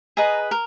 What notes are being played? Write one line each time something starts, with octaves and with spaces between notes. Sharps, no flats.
G#4 B4 D#5 A#5
A#4